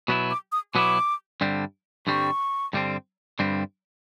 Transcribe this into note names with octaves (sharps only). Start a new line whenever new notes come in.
B2 F#3 B3 E4
D6
D#6
B2 F#3 B3 E4 D6
G2 D3 G3 C4
G2 D3 G3 C4 C#6
G2 D3 G3 C4
G2 D3 G3 C4